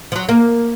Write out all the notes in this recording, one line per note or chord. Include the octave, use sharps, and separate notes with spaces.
F3
F#3
A#3